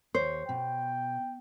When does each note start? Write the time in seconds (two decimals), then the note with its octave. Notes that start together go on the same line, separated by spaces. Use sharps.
0.15 D#2 C5 C#5
0.49 B2 G5